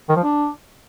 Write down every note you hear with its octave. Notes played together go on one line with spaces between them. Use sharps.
D#3
F3
D4